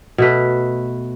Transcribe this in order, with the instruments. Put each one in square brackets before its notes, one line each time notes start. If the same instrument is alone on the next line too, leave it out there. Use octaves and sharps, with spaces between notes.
[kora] B2 A3 B4